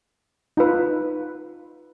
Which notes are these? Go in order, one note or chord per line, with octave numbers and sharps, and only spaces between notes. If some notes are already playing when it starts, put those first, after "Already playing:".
D#4 F4 B4